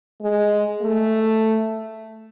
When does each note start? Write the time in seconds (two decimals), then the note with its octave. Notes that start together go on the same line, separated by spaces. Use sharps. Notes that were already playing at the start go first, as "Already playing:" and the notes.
0.22 G#3
0.82 A3